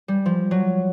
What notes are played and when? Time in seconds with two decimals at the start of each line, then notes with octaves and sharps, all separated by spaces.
0.08 G3
0.26 F3
0.51 F#3